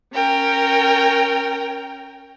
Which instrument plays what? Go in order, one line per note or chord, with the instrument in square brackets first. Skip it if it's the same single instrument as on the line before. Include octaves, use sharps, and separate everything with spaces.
[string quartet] C#4 A#4 G5